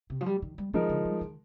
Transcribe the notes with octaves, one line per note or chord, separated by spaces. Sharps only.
C3
F3
G3
D#3
G3
D#3 F3 G#3 D#4 A#4
D3
G3
D#3